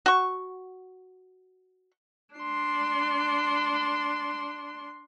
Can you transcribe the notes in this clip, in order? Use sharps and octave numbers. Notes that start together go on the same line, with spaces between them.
F#4 C#6
D4 C6